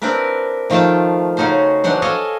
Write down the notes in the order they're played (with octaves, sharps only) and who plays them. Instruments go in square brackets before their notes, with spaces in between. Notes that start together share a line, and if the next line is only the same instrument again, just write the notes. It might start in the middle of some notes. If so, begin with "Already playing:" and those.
[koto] C4 D4 E4 A#4 B4
D#3 F3 A3 F4 G5 A5
C#3 C#4 D#4 F#4 C5
E3 F#3 G#3 D4 C5 F#5
A4 C#5 D#5 F5 G#5